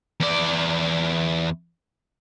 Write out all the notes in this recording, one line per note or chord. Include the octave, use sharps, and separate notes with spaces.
E2 D5